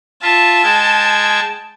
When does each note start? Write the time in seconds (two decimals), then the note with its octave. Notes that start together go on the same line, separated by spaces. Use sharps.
0.22 F4 E5 A5
0.64 G#3 G5 G#6